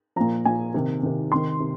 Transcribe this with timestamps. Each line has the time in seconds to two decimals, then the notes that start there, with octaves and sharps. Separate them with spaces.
0.16 F3 A#5
0.20 A#2
0.45 A#2 F3 G#5
0.74 C3 D#3
1.03 C3 D#3
1.32 C3 D#3 C6
1.60 C3